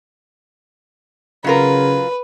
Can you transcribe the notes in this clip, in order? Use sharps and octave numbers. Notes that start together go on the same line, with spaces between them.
C#3 F#3 F4 A#4 B4